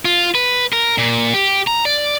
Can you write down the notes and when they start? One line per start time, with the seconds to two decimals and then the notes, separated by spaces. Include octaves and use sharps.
0.05 F4
0.35 B4
0.73 A#4
0.98 A#2
1.34 G4
1.67 A#5
1.85 D5